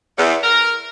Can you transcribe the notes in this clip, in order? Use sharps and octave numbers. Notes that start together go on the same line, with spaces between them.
E2
A#4